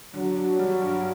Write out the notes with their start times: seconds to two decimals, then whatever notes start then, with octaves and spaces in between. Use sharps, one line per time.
0.14 D3 F#3
0.36 D4
0.59 G3
0.81 G2